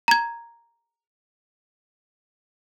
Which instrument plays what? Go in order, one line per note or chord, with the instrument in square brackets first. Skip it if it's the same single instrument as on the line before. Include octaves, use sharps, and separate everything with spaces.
[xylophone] A#5 G#6